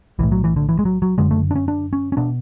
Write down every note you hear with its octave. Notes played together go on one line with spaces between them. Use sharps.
B1 A2 E3
F#3
E3
D3
E3
G#3
F#3
F#3
F#1 F#2 D3 G#3
A3
D4
C#4
D4
C#4
C#4
B2 D4